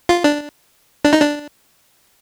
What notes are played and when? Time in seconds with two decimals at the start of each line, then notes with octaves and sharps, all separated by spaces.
0.09 F4
0.24 D4
1.05 D4
1.13 D#4
1.21 D4